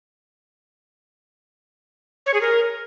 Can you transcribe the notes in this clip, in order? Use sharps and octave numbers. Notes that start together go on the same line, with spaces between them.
C#5
G#4
A#4